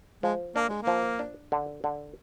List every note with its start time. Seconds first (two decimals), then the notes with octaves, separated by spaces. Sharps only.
0.23 F3 G#3
0.56 A#3 D4
0.69 G#3
0.82 A#3
0.87 F3
1.19 D4
1.52 D3
1.84 D3